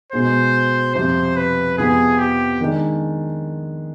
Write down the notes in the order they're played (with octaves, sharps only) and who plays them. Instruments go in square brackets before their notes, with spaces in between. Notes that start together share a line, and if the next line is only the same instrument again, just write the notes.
[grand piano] B2 G#3 B3 [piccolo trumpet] C5
[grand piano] F2 C3 G3 [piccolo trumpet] C5
[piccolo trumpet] B4
[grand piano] F2 C3 F3 B3 [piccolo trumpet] G#4
[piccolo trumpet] G4
[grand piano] D#3 G#3 D4